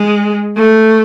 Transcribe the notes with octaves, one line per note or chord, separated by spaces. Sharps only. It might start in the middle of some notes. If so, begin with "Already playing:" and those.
Already playing: G#3
A3